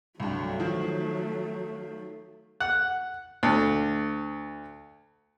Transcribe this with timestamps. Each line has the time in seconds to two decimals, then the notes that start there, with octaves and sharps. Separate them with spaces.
0.20 C2 G2 F#3 A3
0.60 D#3 F3
2.60 F#5
3.43 D2